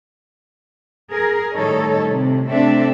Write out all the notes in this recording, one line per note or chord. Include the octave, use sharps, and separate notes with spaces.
G#4 A#4
A2 D#3 G3 D#4 A4 C#5
A2 C3
C3 A3 C4 D4 A4 E5